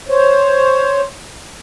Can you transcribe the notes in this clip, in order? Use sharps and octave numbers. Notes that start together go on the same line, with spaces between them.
C5 C#5